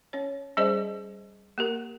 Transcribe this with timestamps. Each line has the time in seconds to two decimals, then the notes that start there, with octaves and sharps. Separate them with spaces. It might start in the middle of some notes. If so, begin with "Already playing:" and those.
0.13 C#4 C#5
0.57 G3 C#4 G#4 C5 D5 D#5
1.58 A#3 G4 A#4